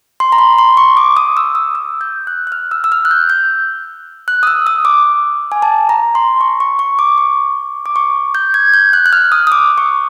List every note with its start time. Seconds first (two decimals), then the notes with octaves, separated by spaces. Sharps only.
0.20 C6
0.32 A#5
0.38 B5
0.58 C6
0.77 C#6
0.97 D6
1.17 D#6
1.37 E6
1.55 D#6
1.75 E6
2.01 G6
2.27 F#6
2.47 F#6
2.52 F6
2.71 E6
2.84 E6
2.92 F6
3.05 F#6
3.11 G6
3.30 G6
4.28 F#6
4.43 D#6
4.47 E6
4.67 D#6
4.85 D6
5.52 G#5
5.62 A5
5.89 A#5
6.15 C6
6.41 C#6
6.60 C#6
6.79 C#6
6.99 D6
7.18 C#6
7.86 D6
7.96 C#6
8.35 G6
8.54 G#6
8.74 G6
8.93 F#6
9.06 F#6
9.13 F6
9.32 D#6
9.47 D#6
9.52 D6
9.78 C#6